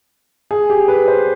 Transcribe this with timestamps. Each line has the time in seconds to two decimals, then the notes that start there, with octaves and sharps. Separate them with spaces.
0.51 G#4
0.70 G4
0.88 B4
1.08 C5